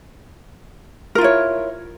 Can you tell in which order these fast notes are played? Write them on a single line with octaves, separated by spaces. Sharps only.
A#4 F4 E4 C#5